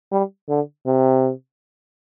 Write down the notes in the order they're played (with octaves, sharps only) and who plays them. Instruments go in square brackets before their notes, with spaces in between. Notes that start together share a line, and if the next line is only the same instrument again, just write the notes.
[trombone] G3
D3
C3